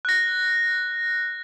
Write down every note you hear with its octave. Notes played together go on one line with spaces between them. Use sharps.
F#6 A#6